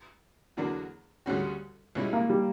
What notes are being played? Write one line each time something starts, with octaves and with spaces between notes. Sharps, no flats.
E2 D3 F#3 A#3 D4
D2 C#3 G3 C#4 F#4
C#2 B2 G3 C#4 E4
A#3
G3